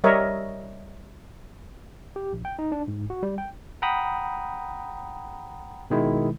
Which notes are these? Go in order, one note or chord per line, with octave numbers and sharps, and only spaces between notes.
G3 A#4 C#5 D#5 E5
G4
A#1
G5
D#4
D4
G#2
F#4
G3
G5
F#5 G5 A#5 B5 D#6
B2 D#3 G#3 E4